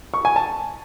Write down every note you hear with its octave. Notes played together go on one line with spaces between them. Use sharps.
C#6
G#5
A5